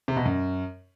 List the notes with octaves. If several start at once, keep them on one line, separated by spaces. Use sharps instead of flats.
C3
B2
F#2